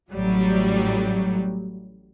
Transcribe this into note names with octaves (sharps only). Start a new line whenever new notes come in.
A1 A2 F#3 G3